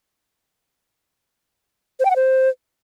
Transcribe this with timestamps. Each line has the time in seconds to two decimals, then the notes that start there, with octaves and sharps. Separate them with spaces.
2.00 C5
2.05 G5
2.10 F#5
2.16 C5